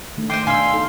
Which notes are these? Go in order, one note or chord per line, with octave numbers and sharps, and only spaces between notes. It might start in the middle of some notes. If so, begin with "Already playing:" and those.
D#3 A3 D4
C5 D#5 G5 C6 D6
B2 D4 D#5 F5 G#5 C6 E6
A3 D#4 A4